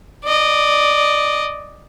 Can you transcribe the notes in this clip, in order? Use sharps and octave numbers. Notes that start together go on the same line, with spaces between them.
D5 D#5